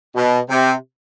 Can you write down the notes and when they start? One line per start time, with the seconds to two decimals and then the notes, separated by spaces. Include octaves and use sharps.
0.15 B2
0.50 C3